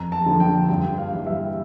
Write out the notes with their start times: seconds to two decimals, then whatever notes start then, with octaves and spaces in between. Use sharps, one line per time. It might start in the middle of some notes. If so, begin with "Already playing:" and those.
Already playing: F2 A#5
0.12 A5
0.26 D3 F3
0.40 G5
0.69 G2 G5
0.98 F5
1.12 E3 G3
1.27 E5